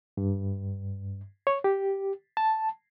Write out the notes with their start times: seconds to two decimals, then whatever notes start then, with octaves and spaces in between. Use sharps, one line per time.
0.17 G2
1.47 C#5
1.64 G4
2.37 A5